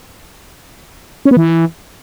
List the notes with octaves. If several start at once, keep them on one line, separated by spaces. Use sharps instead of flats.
C#4
B3
E3